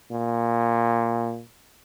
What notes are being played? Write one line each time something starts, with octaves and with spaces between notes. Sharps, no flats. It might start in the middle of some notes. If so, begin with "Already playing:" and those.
A#2